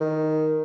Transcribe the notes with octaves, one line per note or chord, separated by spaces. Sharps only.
D#3